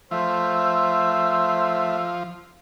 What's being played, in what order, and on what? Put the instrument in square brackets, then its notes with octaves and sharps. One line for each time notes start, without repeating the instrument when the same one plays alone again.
[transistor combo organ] F3 [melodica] A3 E5 [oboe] C5 [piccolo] E6